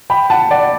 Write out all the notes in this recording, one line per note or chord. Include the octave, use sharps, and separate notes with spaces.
G5 B5
F#5 A5
D5 F#5